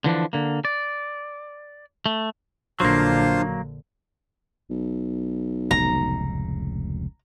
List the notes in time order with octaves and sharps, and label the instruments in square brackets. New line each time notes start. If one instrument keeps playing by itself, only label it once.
[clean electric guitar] D3 E3 F3 D4
D3 A#3
D5
A3
[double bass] A#1 D3 [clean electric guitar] F#3 A#3 [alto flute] D4 [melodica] F4 C5 F5
[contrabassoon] B1
[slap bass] F1 C#2 A2 [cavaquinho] A#5